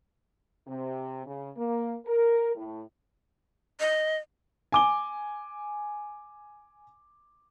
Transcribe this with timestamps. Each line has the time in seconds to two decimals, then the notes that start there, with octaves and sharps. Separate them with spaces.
0.67 C3
1.26 C#3
1.57 A#3
2.06 A#4
2.56 A2
3.80 D#5
4.72 G#5 D6 G7